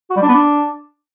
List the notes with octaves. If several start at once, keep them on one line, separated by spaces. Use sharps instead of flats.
F#4
G3
D4
B3
D4